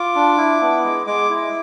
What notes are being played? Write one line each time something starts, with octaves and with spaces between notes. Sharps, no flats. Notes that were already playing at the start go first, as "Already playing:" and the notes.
Already playing: F4 D6
D4
E4
B3
G#3
G#3 D6
E4